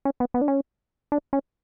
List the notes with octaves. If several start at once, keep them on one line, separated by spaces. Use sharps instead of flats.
C#4
B3
B3
D4
C#4
D4
C#4